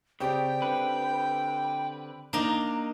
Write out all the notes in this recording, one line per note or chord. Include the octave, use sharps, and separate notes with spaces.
C#3 C4 G4 D5 G5
D3 B4
A#3 D4 D#4 A#5